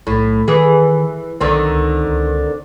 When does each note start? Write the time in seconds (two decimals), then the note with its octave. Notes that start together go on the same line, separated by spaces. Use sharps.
0.07 B1 A2
0.48 D#3 E3 G#4
1.40 B1 D3 D#3 C4
1.69 C#2
2.06 C#2